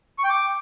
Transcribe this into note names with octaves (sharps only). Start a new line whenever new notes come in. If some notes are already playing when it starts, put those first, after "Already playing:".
C#6
G5
D6